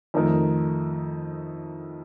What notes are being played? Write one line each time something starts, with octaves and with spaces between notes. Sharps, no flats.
F2 D#3 A3 D#4 A#4